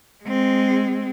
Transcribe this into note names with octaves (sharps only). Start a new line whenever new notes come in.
G#3 C4